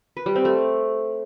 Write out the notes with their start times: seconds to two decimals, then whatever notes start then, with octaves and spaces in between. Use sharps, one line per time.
0.17 B4
0.26 G3
0.35 C4
0.45 A3